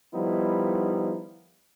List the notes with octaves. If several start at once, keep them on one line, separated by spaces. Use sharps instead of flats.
D#3 F3 G3 B3 D#4 E4